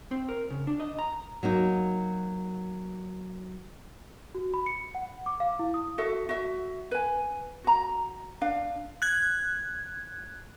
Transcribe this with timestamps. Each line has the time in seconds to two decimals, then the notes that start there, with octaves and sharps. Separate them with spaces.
0.11 C4
0.29 A#4
0.50 C#3
0.67 D4
0.80 D#5
0.99 A#5
1.43 F#3 A#3 D#4
4.35 F#4
4.54 B5
4.66 C#7
4.95 F#5
5.26 D6
5.40 F5
5.59 E4
5.74 D#6
5.98 F#4 A4 E5
6.29 F#4 E5
6.91 B4 G#5
7.64 F#4 A#5
8.41 D4 F5
9.02 F#6 G#6